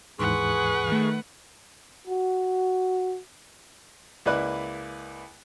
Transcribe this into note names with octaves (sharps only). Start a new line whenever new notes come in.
D#2 G#2 E3 G#4 B4 F#5 C6 C#6
D#3 A3
F#4
C#2 A#3 E4 B4 D5 F#6